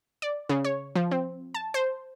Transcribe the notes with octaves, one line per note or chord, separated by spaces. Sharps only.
D5
C#3
C#5
F3
C4
A5
C5